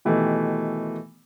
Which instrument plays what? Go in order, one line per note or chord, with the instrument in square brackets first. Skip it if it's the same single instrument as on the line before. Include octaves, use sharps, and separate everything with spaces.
[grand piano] B2 D#3 E3 A3 G4